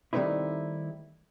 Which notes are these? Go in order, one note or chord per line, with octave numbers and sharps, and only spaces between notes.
D#3 G3 A3 C4 D#4 E4